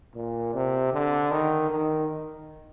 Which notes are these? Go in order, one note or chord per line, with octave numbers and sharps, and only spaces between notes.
A#2
C3
D3
D#3
D#3